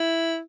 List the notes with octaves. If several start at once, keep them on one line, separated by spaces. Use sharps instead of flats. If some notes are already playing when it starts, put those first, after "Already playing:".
Already playing: E4